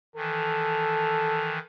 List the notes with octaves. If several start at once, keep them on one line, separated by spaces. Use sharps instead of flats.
D#3 E3 A4